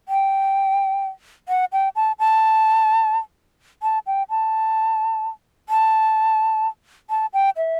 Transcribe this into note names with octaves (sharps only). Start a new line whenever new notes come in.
G5
F#5
G5
A5
A5
A5
G5
A5
A5
A5
G5
E5